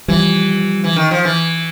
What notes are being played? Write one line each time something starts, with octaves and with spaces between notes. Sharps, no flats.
E3 F3 G3
E3
D#3
F3
E3